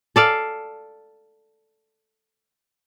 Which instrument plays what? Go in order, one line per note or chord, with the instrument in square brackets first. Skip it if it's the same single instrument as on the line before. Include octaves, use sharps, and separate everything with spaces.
[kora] A4 D5 F5